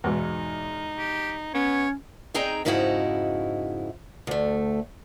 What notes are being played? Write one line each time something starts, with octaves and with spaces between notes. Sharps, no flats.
E2 G#2 B2 D#4
G4
B3 C#4 C#5
C4 D#4 G#4 G5 A#5
F2 G#2 C#3 D#4 E4 F#4
D2 A3